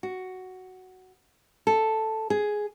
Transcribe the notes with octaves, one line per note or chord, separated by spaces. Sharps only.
F#4
A4
G#4